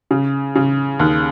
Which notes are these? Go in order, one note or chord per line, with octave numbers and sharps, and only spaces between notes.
C#3
C#3
D#2